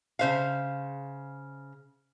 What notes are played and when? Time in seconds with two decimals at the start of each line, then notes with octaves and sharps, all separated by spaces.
0.19 C#3 C5 E5 F5